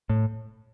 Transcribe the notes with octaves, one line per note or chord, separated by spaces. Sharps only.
A2